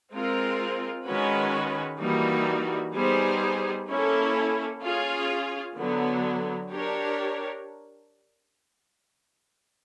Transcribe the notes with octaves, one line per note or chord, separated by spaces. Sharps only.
G#3 C4 F4 A#4
D#3 G#3 C#4 F#4 B4
E3 G3 A#3 D#4 F#4
G3 B3 D#4 G#4 C5
A#3 C#4 E4 A4
C#4 F4 G#4
D3 F#3 B3
D4 G4 A#4 C#5